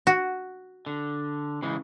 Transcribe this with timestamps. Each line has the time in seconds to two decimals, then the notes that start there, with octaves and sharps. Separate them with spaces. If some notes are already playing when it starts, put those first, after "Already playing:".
0.07 F#4
0.86 D3
1.62 C#3 E3 G#3